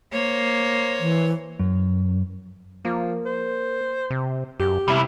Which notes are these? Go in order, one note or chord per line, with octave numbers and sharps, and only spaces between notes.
A#3 C5 C#5
E3
F#2
F3 A#3
C5
C3
F#2 G4
C3 G3 E4